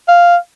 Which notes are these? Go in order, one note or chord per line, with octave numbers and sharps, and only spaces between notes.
F5